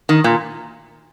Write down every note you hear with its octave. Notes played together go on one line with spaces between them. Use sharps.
D#3
A#2